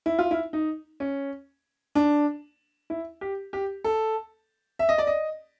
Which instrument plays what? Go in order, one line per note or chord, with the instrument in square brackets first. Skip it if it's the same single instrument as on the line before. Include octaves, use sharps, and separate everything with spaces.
[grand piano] E4
F4
E4
D#4
C#4
D4
E4
G4
G4
A4
E5
D#5
D5
D#5